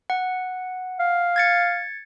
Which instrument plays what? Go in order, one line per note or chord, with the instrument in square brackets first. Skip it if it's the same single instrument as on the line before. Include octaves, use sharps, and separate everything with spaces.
[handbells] F#5
[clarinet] F5
[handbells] G#6 A6 C#7